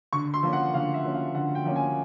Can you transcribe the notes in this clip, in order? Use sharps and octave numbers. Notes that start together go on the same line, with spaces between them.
D3 C#6
C6
F3 A#3 C#4
F#5
D3 F5
E5
F3 A#3 C#4
F5
D3 F#5
G5
F3 A#3 C#4
G#5